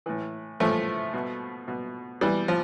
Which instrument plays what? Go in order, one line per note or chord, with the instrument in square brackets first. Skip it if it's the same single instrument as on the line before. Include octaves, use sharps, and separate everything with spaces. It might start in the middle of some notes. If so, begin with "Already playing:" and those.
[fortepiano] A2 E3
A2 E3 F3 A3
B2
B2
B2 E3 G3
F3